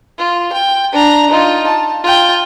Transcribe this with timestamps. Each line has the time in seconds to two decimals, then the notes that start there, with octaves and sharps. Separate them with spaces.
0.18 F4
0.52 G5
0.92 D4 A#5
1.30 D#4 F4
1.67 A5
2.04 F4 G5